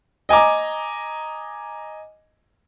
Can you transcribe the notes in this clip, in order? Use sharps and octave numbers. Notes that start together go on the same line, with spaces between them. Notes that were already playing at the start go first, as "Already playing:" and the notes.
D#5 G#5 A#5 D6